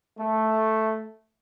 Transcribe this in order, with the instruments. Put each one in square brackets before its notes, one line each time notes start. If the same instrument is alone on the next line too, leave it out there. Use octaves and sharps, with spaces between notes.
[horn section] A3